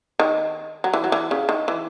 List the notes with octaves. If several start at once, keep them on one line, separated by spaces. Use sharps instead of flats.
D#3
F#3
E3
F#3
E3
C#3
D#3
E3